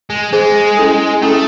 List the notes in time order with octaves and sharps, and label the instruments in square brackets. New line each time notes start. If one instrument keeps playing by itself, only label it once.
[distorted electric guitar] G#3
[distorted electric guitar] G#3 [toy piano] G#4 C5 D#5
[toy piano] C#4 E4 A4
[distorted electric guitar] A3 [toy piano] C#4 E4 A4